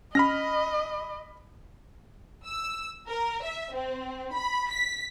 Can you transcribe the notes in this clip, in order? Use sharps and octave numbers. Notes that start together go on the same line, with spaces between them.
C#4 D#5 B5 F6 A#6
E6
A#4
E5
C4
B5
B6